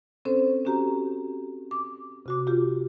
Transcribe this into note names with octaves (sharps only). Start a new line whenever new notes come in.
C4 C#4 A4 C5
C#4 F#4 G4 A#5
D6
C3 F#4 D6
F4 G4